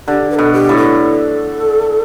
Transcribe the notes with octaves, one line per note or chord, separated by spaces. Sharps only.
D3 G4
B4
B2 A4
G4
A2
A4